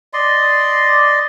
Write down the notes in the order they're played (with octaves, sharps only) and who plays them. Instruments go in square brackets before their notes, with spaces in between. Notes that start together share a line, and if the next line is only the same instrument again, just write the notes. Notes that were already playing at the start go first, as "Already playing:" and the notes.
[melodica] D5 D#5 C6